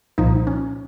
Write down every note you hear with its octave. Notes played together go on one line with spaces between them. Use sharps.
C2 A#2 F3 D#4
C#4